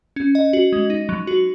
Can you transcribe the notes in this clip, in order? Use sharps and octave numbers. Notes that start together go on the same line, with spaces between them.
C#4
D#5
F#4
G#3
D#4
F#3
F#4